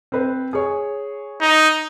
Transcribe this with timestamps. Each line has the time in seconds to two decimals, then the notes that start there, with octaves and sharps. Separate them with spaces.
0.12 C4 B4 C5
0.53 G#4 C#5
1.41 D#4